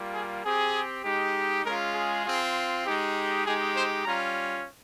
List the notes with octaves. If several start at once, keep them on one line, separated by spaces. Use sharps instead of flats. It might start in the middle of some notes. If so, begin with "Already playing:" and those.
Already playing: G3 A#3 F4
G#4
C4 G4 G#4
G#3 D#4 G4
G#3 C#4 F4 A#4
G#4
C4 F4
G#3 D#4 G4
G#3 D#4 G4 G#4
C5
G3 C#4 F4 A#5